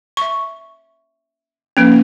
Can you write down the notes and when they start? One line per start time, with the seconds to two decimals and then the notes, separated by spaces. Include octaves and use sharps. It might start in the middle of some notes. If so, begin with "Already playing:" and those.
0.17 E5 C#6
1.77 F3 A#3 C#4